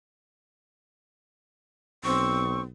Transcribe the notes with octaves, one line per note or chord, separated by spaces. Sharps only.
B1 C4 C#6